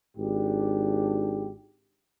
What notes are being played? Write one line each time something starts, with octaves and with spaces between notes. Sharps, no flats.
G#1 G#2 D4 G4